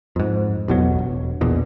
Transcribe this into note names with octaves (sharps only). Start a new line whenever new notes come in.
F2 G#2
A1 E2 B2 F#3
E1
A#1 E2 B2